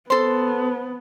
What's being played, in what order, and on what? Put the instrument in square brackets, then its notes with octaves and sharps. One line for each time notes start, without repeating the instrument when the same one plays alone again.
[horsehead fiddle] B3 [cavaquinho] A4 C6 [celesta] C5